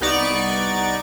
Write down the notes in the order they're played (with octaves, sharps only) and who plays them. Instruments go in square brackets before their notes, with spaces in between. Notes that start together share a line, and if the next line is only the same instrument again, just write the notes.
[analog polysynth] C2 B3 D#4 D5 C#6 D7